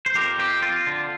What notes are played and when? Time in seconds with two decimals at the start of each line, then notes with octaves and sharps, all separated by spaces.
0.06 C5
0.15 F2 G4 A#4
0.39 C4 G4
0.62 C4 F4
0.87 D3